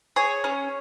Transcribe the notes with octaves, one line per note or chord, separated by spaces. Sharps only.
G#4 C#5
C#4